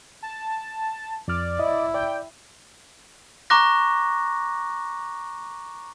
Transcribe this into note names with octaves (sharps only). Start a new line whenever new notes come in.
A5
F2 D5 F6
E4 D#5
D5 G5
A#5 C#6 D6 F#6 A#6